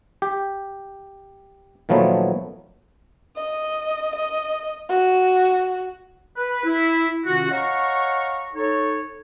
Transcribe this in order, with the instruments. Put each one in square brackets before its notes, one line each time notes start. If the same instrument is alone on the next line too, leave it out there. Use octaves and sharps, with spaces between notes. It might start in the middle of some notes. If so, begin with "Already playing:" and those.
[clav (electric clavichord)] G4
A#2 D#3 F3 F#3 A3 B3
[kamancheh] D#5
D#5
F#4
[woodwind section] B4
E4
C3 D#3 C#4 F4 F#4
C#5 D#5 F5 F#5 A#5 C#6
D#4 A4 C#5